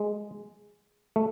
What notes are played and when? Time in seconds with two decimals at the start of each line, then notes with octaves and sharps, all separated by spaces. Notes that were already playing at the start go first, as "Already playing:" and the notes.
Already playing: G#3
1.16 A3